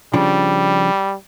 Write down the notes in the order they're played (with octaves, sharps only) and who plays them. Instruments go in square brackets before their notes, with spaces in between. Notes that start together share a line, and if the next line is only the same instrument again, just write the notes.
[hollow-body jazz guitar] C#3 F3 D4 [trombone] G3